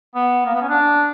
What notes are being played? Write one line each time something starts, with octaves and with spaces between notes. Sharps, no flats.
B3
A#3
B3
C#4
D4